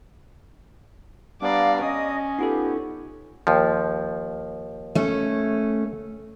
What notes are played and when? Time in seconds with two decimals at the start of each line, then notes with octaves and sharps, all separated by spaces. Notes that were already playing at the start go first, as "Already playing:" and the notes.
1.41 G3 B3 D4 D5 F5 A#5
1.82 C#4 D#5 D#6
2.39 B3 D#4 F4 G4 A4
3.47 D#2 F3
4.95 A3 C#4